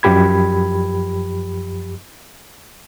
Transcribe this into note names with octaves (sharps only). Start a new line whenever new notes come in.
F#2 F3 G4 B5 G#6